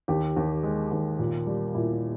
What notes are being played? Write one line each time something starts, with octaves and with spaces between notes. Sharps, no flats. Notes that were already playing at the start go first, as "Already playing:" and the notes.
D#2 G4
D#2
G#3
D#2
A#2
G3
A#2 E4